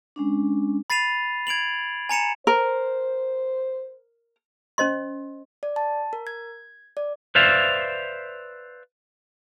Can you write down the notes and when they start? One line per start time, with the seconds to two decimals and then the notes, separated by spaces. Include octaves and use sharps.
0.16 G#3 C#4 D4
0.90 B5 A6 C7 D#7 F7
1.47 G#6 D7 F7 F#7
2.09 G#5 A#5 C#7 E7
2.47 A#4 C5
4.78 C#4 C5 D#5 C6
5.63 D5
5.76 A5
6.13 A#4
6.27 G#6
6.97 D5
7.35 B4 C5 D5 E5 F5